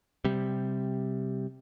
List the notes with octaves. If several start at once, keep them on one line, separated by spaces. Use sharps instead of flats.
C3 G3